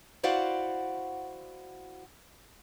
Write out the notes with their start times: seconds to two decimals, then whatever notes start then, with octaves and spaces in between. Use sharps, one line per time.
0.23 E4 F#4 C5 D5 F5 F#5